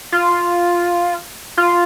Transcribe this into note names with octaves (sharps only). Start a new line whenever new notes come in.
F4
F4